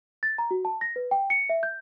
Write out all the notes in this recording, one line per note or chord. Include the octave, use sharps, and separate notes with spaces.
A6
A#5
F#4
A5
A#6
B4
G5
C#7
E5
G6